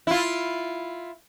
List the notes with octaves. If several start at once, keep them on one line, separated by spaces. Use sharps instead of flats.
E4 F4